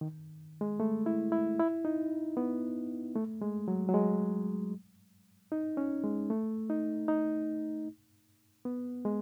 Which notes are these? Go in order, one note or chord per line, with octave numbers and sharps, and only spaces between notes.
D#3
G#3
A3
E4
E4
E4
D#4
B3
A3
G#3
F#3
F#3
G#3
D#4
C#4
G#3
A3
D#4
D#4
B3
G#3